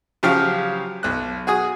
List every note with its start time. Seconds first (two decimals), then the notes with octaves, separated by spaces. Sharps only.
0.23 C#3 F3 F#3 G4 F5 F6
1.03 B1 F#6
1.47 F#4 G#4 G#5 D#6